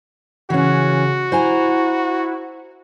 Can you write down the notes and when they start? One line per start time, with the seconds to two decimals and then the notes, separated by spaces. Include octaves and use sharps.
0.50 C#3 E3 C#4 F#4
1.32 E4 C5 G#5 A#5